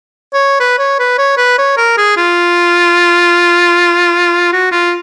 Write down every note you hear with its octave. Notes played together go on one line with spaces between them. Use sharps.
C#5
B4
C#5
B4
C#5
B4
C#5
A#4
G#4
F4
F#4
F4